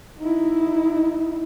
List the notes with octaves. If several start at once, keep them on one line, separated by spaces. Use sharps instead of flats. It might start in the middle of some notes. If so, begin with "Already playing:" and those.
D#4 E4